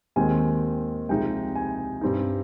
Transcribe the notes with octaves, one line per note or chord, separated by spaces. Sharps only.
D#2 D#3 G#3 C4 G#5
C2 C3 F3 G#3 D#4 G5
G#5
G2 G3 C4 D#4